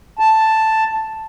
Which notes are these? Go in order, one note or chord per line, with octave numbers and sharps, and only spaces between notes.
A5